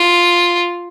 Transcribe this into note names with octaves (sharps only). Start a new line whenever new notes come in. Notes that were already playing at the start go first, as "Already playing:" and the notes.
Already playing: F4